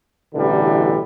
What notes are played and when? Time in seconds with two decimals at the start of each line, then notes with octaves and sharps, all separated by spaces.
0.35 A1 B2 D3 E3 G3